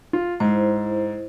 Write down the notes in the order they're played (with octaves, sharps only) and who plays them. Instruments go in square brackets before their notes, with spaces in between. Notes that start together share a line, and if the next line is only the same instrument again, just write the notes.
[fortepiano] F4
[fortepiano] G#2 [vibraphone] E4 C5